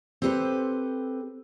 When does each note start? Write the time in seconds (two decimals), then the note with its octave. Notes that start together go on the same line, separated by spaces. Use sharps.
0.22 C4 G4 A4 B4 C5